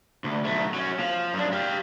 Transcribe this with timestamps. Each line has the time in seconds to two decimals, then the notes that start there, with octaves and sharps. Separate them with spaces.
0.24 D2
0.45 B1 A3
0.74 F#3 C#4
1.00 F3
1.33 F#2 D4
1.53 G4 F5